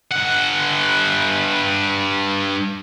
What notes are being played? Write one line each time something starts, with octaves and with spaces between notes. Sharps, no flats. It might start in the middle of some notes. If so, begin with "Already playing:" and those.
G2 F#5